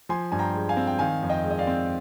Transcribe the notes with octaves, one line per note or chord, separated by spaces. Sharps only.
F3 G#5 C6
G2 G#5
G5 A#5
G#3
F5 G#5
C4
G5
D#3 F5 G#5
F2
D#5 G5
G#3
D#5
D5 F5
C4